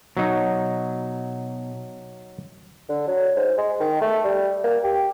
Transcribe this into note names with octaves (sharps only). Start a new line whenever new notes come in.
B2 F#3 D#4
D3
F#3
G#2
G#3
D#3
A3
G3
A#3
G4